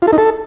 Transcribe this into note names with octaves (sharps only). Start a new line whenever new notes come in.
F4
A4
D#4
A4